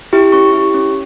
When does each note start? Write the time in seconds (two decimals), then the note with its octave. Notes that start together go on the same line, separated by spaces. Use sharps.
0.13 E4 G4
0.32 C#4 C#6
0.53 E4 G4
0.74 C#4